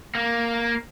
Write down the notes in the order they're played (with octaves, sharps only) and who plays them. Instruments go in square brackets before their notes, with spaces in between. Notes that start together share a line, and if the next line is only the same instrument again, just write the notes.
[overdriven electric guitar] A#3